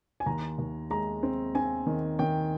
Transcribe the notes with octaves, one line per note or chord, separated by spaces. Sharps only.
G#5
D#2 A#5
D#2
G#3 A#5
C4
C4 G#5
D#3
D#3 G5